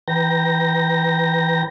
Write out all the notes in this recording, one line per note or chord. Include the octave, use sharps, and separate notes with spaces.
E3 B4 G5 A#5 A#6